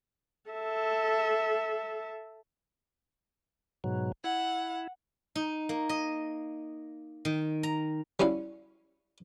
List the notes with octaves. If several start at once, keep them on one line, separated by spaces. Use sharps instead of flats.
A4 E5
G#2 B2 F#3
E4 F#5
D#4
A#3
D#5
D#3
A#5
G3 C#4 E4 F5